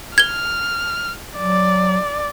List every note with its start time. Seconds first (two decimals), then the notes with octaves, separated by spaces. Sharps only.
0.18 F6 G#6 G7
1.37 F#3 D5